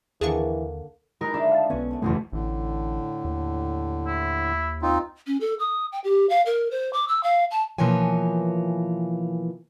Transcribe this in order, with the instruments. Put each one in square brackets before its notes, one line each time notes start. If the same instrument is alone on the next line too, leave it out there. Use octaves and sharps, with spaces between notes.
[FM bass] D#2 [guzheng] D3 A#3 A5 [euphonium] E3 [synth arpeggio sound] G#4 C#6
[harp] G#3 D#4 A#4 [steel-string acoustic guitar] G4 B4
[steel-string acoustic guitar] A3 E4 F4 [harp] D4 A4
[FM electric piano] F5 A5
[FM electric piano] B1 B3 [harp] C#4 [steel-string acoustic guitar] F#4
[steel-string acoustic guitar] F2 D3 A3
[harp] F#1 B1 E2 [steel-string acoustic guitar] G#3 F#5 [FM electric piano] A3
[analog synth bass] A1 [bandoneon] A2 D3
[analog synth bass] D#2
[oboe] E4
[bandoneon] C4 D#4 F4
[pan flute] C#4
A4
D#6
G5
G4
F5
A#4
C5
D6
E6
F5
A5
[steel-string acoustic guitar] B2 E3 F3 A#3 C#5 G#5